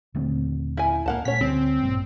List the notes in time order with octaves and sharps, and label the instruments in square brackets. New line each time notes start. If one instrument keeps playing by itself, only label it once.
[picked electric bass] D#1 A3 C4 [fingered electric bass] D3
[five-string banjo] E4 G#5
[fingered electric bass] C#2 A2 [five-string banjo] A#3 F#5 A5
[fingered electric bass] A#2 G#3 A3 [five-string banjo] C#4 C#5 [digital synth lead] B6
[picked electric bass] D2 [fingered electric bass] G3 [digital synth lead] C4
[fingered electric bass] A1 A#2 [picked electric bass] G2